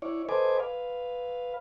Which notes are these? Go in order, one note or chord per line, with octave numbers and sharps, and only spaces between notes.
E4 C#5 D5
A4 B4 C5 D#5 G#5 D6
B4 F5